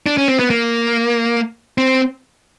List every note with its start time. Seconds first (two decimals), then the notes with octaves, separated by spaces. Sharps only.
0.06 D4
0.17 C#4
0.28 C4
0.39 B3
0.50 A#3
1.78 C4